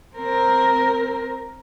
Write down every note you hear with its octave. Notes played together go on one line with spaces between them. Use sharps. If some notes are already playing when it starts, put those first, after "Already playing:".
C4 A#4